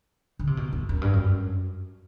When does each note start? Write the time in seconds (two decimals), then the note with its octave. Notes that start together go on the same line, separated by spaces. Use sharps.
0.39 D3
0.47 C3
0.57 B2
0.73 F#2
0.89 F#2
1.02 G2
1.13 F#2